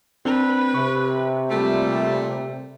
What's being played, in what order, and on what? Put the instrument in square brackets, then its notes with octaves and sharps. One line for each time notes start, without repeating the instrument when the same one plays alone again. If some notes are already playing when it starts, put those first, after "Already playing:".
[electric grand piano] C4 D4 [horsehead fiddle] B4
[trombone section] C3 [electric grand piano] C#6
[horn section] A#2 A3 [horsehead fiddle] G3